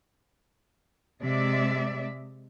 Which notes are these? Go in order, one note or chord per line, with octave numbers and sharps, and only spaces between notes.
C3 G#3 D5 E5